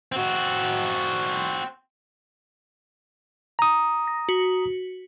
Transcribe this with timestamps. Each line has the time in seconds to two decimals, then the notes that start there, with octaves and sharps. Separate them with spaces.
0.12 C4 F#4
3.59 A#5 D#6
4.07 A#6
4.29 F#4